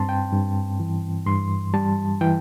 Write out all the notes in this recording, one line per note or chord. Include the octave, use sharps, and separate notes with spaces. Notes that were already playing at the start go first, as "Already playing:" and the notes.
Already playing: G2 C4 A5 C6
G5
G2
E3
G2 C6
G3 A5
E3 G5